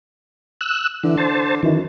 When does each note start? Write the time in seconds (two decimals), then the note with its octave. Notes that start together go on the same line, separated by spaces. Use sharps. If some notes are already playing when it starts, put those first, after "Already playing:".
0.61 E6 F#6
1.03 D3 E3
1.18 C5 A5
1.63 F#2 D#3 E3